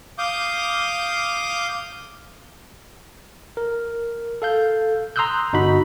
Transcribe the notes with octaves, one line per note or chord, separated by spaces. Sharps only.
F5 D6 D#6 G6
A#4
A4 F5 G6
A#5 C6 D#6 E6 F#6 G6
G1 D#4 F#4 B5